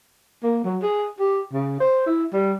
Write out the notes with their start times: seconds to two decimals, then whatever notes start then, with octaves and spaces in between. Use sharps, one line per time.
0.43 A#3
0.64 F#3
0.82 G#4
1.19 G4
1.53 C#3
1.80 C5
2.06 E4
2.32 G3